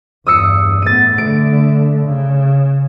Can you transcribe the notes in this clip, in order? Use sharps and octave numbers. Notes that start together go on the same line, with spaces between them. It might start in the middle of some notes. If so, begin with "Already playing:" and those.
E2 G2 D#6 E6 C#7
A2 B3 A6 D#7
D3 A3 D7
C#3